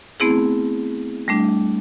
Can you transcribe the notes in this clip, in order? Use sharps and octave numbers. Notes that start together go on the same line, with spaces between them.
A3 B3 C4 E4 G#4
G3 A3 D4